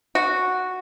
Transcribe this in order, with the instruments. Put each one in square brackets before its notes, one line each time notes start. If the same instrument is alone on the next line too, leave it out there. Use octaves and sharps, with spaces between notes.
[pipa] F#4